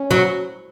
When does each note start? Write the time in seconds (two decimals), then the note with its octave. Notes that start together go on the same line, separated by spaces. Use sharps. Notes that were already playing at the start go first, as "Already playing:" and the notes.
Already playing: C#4
0.11 F#3